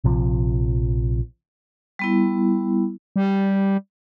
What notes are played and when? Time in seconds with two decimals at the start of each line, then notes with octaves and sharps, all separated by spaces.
0.04 A#1 C3 F3
1.99 G3 B3 E4
3.16 G3